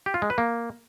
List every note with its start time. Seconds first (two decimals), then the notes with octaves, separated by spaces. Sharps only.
0.06 G4
0.14 F4
0.22 G#3
0.30 B4
0.38 A#3